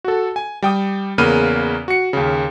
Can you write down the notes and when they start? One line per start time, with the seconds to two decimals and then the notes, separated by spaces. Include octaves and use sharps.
0.05 F#4 A4
0.36 G#5
0.62 G3 G5 D#6
1.18 E2 C#3 A#3 B5 F6 D#7
1.88 F#4 C#7
2.13 D#2 C#3